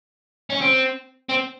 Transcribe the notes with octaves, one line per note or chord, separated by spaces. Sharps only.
C#4
C4
C4